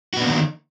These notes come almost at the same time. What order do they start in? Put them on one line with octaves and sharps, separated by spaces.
F#4 B3 D4 A#3 D#3